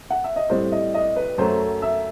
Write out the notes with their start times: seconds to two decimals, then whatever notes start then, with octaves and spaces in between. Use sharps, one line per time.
0.10 F#5
0.24 E5
0.36 D#5
0.49 A2 G3 C4 C5
0.72 D#5
0.94 D#5
1.16 B4
1.38 F#2 F#3 A3 C5
1.82 E5